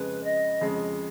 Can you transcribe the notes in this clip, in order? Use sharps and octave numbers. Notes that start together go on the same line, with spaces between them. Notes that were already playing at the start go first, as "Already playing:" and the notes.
Already playing: F2 C#3 G#3 B4
D#5
F2 C#3 G#3